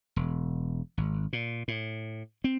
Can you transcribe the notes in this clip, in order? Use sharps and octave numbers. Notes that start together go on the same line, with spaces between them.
E1
G#1
A#2
A2
C4